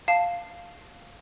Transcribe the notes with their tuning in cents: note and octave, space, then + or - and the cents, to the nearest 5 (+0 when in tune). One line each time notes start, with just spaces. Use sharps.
F5 +0 A5 +0